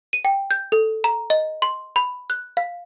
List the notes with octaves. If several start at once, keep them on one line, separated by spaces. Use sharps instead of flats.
D#7
G5
G6
A4
A#5
D#5
C6
B5
F#6
F5